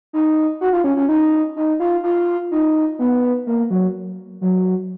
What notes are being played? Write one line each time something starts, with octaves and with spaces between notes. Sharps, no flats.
D#4
F#4
F4
C#4
C#4
D#4
D#4
F4
F4
D#4
B3
A#3
F#3
F#3